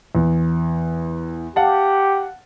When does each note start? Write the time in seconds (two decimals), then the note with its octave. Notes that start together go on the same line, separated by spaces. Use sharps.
0.15 E2
1.56 G4 F5 F#5 A5